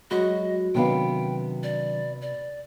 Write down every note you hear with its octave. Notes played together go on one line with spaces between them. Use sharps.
F#3 G#3 F#4 D#5 B5
C3 D#3 F#3 B3 D4 F5 G5
D5
D5